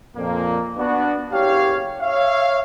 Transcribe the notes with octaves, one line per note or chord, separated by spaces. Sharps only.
F2 A#2 A#3
B3 D4 F#4
F#1 G4 C#5 F5
C#5 E5 F5